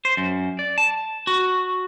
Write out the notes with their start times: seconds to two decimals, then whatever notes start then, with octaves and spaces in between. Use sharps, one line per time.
0.05 C5
0.17 F#2
0.59 D5
0.78 A5
1.27 F#4